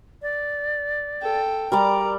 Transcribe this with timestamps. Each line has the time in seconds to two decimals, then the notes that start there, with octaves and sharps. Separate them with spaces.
0.22 D5
1.22 A4 G5
1.72 G3 A#4 D5 A#5 D6